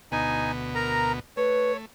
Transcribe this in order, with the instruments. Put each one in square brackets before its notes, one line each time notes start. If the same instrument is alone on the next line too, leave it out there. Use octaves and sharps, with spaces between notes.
[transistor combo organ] D2 B2 B3 [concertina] D#4 G#5
[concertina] A#4 A#5
[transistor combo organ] A3 [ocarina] B4 [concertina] C#5